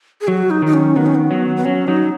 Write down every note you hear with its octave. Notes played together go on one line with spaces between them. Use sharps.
G#4
F#3 F#4
D#4
D#3 D#4
C#4
D#3 B3
C#4
B3
F#3
B3
F#3 C#4
F#3 D#4